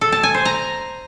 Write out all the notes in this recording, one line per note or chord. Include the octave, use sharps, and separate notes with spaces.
A4
A5
G#5
C5
A#5